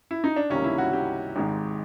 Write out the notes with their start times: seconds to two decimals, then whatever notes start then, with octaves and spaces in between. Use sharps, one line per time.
0.11 E4
0.24 D#4
0.36 D4
0.50 C#2 C3 D#3 G3 A#3 C#4
0.64 E4
0.78 F#4
0.93 G4
1.36 G#1 G#2 D#3 G#3